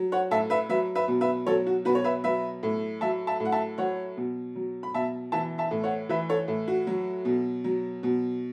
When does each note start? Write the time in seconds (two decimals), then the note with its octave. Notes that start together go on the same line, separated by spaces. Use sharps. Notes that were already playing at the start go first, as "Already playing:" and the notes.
Already playing: F#3
0.12 C#5 F#5
0.31 A2 E5 A5
0.50 B4 E5
0.69 F#3 B4 E5
0.95 B4 E5
1.08 B2
1.21 B4 E5
1.47 F#3 A4 C#5
1.67 F#4
1.85 B2 F#4 B4
1.95 C#5
2.04 B4 E5
2.24 F#3 B4 E5
2.63 A2
3.01 F#3 E5 A5
3.27 E5 A5
3.40 A2
3.45 F#5
3.52 E5 A5
3.78 F#3 C#5 F#5
4.17 B2
4.56 F#3
4.83 B5
4.94 B2 E5 A5
5.32 E3 E5 A5
5.58 E5 A5
5.71 A2
5.84 C#5 F#5
6.09 E3 B4 E5
6.29 A4 C#5
6.48 A2
6.68 F#4
6.87 F#3
7.25 B2
7.64 F#3
8.03 B2